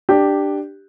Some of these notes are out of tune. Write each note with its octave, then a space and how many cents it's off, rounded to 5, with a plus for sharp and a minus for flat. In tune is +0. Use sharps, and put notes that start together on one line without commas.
D4 +10 G4 +0